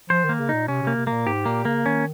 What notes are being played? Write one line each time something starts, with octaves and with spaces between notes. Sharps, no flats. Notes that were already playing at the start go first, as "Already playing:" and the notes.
F3 C5
D#3 A#3
C#3
A#2 D#4
C3 C#4
C3 A#3
C3
A#2 A#3
G#2 G4
A#2 A#3
C#3 A#3
D#3 C#4